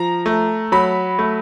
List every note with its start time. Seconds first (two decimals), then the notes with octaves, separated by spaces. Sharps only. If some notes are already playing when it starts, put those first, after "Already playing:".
Already playing: F3 A#5
0.26 A3
0.72 F#3 B5
1.19 A3